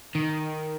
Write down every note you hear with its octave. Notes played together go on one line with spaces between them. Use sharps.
D#3